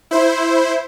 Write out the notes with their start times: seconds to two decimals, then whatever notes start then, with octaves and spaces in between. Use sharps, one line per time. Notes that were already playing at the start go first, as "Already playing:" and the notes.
0.11 E4 C5